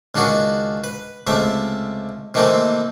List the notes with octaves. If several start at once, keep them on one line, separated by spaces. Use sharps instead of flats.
C#2 D#3 D4 F#4 G#4
B4
C#2 C3 A3 E5
C3 D#3 E3 A3 A#3 C4